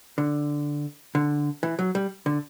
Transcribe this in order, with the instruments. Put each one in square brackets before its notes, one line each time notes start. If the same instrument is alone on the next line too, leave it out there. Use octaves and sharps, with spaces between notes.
[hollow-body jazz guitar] D3
D3
E3
F#3
G3
D3